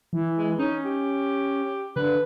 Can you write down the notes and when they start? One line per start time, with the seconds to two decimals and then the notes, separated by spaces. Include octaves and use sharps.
0.13 E3
0.37 G#3
0.59 C#4 D#4
0.85 G4
1.96 D3 B4